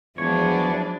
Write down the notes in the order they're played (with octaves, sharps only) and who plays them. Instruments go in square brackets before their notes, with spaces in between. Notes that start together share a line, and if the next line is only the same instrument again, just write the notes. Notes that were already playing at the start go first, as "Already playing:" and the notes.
[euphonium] E2 [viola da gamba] F3 G#3 [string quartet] F#3 D4 E4 [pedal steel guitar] C#5